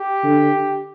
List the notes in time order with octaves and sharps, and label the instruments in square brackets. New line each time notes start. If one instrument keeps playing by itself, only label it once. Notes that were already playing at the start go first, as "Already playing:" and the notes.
Already playing: [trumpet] G4
[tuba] D3